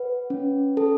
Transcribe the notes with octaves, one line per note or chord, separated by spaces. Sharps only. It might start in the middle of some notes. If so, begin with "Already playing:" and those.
Already playing: B4 F#5
C#4
A4